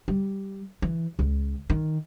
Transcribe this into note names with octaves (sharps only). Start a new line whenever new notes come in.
G3
E3
C#2
D#3